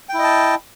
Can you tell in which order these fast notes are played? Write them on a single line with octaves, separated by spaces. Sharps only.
G5 E4 D#5 A5